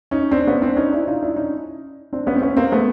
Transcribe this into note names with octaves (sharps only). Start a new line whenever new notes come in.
C#4 D#4
C4 D4
B3 C#4
C4 D4
C#4 D#4
D4 E4
D#4 F4
D4 E4
C#4 D#4
C4 D4
B3 C#4
C4
B3 C#4
A#3 C4
A3 B3